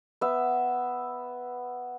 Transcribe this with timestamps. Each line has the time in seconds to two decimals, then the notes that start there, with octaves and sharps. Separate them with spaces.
0.21 B3 E5